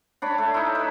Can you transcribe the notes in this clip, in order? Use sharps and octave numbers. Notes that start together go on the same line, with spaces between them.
D4 C#5 B5
A3
D#4 E4
B4